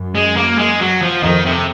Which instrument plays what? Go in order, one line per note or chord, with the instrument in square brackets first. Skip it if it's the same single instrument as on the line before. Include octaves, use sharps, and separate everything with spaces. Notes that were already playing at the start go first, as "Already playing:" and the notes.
Already playing: [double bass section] F#2
[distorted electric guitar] G#3
A#3
G#3
F#3
F3
[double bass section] F2 [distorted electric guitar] D#3
[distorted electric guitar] C3